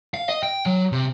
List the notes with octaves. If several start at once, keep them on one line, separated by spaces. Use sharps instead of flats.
F5
D#5
G5
F#3
C3